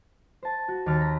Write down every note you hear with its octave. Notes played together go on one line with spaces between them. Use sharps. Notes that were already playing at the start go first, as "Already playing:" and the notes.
C5 A5
F#4
D#2 A5 D6 F6
A#5 B6